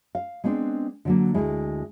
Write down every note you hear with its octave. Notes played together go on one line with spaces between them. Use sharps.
F5
G#3 B3 C4 D4
D3 F#3 A#3
D2 G#3 E4